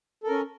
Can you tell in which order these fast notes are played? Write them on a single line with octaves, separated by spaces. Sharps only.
A4 A#4 C#4